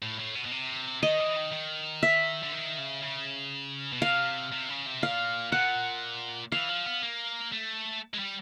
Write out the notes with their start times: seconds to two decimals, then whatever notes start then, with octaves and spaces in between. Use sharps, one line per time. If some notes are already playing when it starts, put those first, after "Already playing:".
0.02 A2
0.20 A2
0.35 B2
0.46 B2
0.52 C3
1.03 D#3 D#5
1.20 E3
1.36 D#3
1.52 D#3
2.03 E5
2.43 D3
2.52 D#3
2.78 C#3
3.02 C#3
3.93 B2
4.02 C3 F5
4.53 C3
4.70 C#3
4.86 C3
5.02 A#2 F5
5.52 A#2 F#5
6.52 E3 F5
6.69 F3
6.86 B3
7.02 A#3
7.52 A3
8.14 G#3
8.19 G3